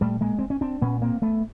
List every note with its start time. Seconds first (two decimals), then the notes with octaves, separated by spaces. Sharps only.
0.01 A#2 G3 A3
0.21 G#3 A#3
0.39 C4
0.50 C#4
0.61 C4 D4
0.81 A#2 B3 C#4
1.02 A#3 C4
1.22 A3 B3